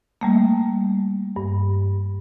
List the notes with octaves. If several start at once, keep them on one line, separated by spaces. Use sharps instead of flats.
G3 A3 A#3
G2